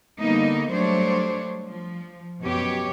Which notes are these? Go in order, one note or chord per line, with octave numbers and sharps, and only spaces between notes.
D3 G3 A#3 B3 D#4
F#3 G3 A3 D4 C5 C#5
F3
F#2 B2 G4 C#5